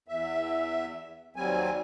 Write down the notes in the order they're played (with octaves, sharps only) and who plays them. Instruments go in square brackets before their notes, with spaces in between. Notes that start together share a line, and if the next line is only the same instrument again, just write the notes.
[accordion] E2 E5
D#2 F#3 G3 C4 G#5